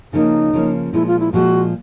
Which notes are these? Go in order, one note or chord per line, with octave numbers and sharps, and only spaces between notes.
C#3 F3 A#3 C#4 D#4
C#3 F3 A#3 C#4
A#2 F3 G#3 E4
F4
E4
A#2 F3 G#3 F#4